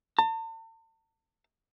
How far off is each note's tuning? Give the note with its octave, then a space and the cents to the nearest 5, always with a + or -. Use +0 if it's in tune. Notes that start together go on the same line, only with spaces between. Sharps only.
A5 +40